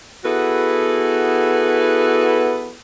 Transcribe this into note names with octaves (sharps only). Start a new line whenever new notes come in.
B3 E4 F#4 G#4 A4 B4